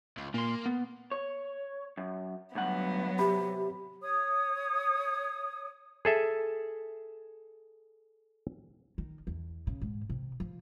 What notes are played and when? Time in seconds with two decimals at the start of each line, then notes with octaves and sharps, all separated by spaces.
0.17 C#2
0.34 A#2 A#3 C6
0.66 B3
1.12 C#5
1.97 F#2
2.55 D2 G2 F#3 B3 F#5
3.19 C3 G4 B5
4.01 C#5 D#6
6.05 G#4 A4 E5
8.98 D#3
9.27 E2
9.67 C#3
9.82 G#2
10.10 C3
10.40 F3